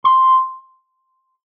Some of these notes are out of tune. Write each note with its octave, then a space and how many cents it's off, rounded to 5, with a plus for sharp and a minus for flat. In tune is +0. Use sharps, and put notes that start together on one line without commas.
C6 +0